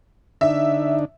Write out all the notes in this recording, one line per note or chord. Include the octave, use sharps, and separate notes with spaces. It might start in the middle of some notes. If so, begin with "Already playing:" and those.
D3 D4 D#4 E5